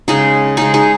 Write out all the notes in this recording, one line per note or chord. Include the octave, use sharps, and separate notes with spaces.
C#3 G#3 D#4 G#4
C#3 G#3 D#4 G#4
D#4 G#4